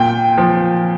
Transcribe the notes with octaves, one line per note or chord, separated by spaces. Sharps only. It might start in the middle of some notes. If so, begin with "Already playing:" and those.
Already playing: A#2 G5
F3